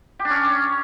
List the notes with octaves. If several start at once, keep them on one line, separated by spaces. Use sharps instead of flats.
G4
D4
C#4